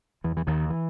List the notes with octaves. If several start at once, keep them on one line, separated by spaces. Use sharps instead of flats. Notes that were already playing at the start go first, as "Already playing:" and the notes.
E2 E3
E3
D#2 D#3
E3